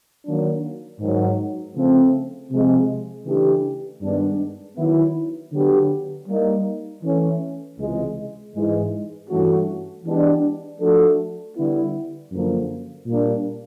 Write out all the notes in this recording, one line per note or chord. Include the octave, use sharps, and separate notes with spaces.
D#3 F#3 A#3 D4
G#2 D#3 F#3
C#3 F3 A3 C4
C3 F3 G#3
C#3 E3 A3 D4 G4
G2 D#3 G#3 B3 D4
D#3 F#3 B3 E4
D3 F#3 B3 D4 G4
G3 A#3 D#4
E3 A3 C#4
C#2 C3 E3 G#3
G#2 E3 G#3
G2 E3 A3 C#4 F#4
E3 G#3 B3 D4 G4
F3 A3 D4 F#4 A4
D3 G3 B3 E4
F#2 D3 F3 A#3
A#2 G3 A#3 D4